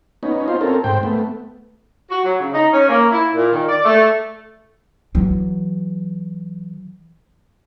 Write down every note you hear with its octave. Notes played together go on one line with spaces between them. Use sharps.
B3 C#4 D#4
D#4 F4 C5
C4 C#4 A4 A#4
G#2 C5 G5
A3 B3
F#4
F#3
C#3
D#4
C#4
A#3
E4
A#2
D#3
D5
A3
E3 F#3